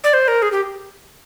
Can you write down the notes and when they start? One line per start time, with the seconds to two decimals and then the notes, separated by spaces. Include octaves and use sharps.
0.04 D5
0.14 C5
0.28 A#4
0.42 G#4
0.52 G4